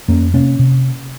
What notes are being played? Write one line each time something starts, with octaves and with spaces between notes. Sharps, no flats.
F2 A#3 C#4
C3 A#3 C#4
C3